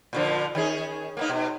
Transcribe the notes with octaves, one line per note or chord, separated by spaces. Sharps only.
A#2 D3 F3
D#3 C#4 G#4
A#3 B3 D#4
B2